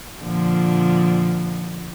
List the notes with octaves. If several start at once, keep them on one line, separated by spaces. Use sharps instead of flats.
A#2 D3 F3